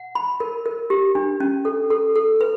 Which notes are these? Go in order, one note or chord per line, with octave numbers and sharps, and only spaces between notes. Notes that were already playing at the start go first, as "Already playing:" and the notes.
Already playing: F#5
B5
A#4
A#4
G4
D4
C#4
A4
A4
A4
B4